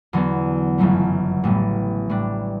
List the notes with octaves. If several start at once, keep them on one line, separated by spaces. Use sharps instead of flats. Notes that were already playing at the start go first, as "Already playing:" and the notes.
E2 D3 F#3 B3
G1 F#2 C#3 F#3 A3
A1 A2 G3 B3
A2 G3 D4